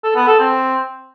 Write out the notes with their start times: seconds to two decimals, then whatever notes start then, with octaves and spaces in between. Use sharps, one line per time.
0.04 A4
0.16 B3
0.27 A4
0.39 C4